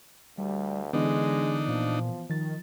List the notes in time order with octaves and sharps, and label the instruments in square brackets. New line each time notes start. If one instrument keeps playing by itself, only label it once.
[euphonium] D2 [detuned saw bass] G3
[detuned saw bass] D3 [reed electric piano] E3 B3 [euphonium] G#3 [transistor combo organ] D4 D#4
[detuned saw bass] A#2 [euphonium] F3
[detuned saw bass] D#3 [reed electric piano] F3 A6